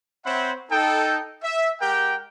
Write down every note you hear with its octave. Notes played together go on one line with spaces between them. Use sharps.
C4 C5 C#5 E5 F#5 B5
D#4 A4 G5
E5
G#3 G4 A#4 F#5 G5